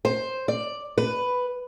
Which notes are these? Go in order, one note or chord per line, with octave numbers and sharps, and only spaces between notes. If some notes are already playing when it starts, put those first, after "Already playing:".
C5
D5
B4